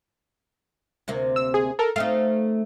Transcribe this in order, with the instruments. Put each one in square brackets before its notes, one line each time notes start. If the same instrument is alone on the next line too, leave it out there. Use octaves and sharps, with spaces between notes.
[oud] D2 C3 A#3
[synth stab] E6
G#4
A4 A#4
[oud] A3 C4 D#4 [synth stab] F5